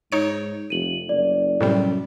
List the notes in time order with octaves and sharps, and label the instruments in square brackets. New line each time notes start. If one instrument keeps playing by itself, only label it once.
[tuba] G#2 [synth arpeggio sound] D#4 C#5 D7
[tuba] F1 [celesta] D#7 F#7
[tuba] F#1 [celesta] D5
[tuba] F#2 [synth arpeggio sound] A2 C3 G3